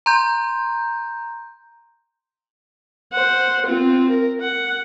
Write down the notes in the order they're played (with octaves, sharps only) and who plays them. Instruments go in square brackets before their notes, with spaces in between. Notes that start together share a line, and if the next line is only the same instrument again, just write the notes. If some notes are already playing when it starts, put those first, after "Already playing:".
[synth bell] A#5 C6 G6
[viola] C5 F#5
C4 F4
A#4
F#5